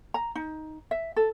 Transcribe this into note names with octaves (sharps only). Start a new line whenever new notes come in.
A#5
D#4
E5
A4